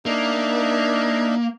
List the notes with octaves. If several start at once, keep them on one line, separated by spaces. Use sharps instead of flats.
A#3 D4 D#4 E5